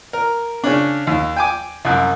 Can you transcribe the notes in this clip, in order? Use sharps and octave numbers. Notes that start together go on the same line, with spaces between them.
A#4
C#3 C#4 D4
D#2
G5 G#5 D6
C2 F#2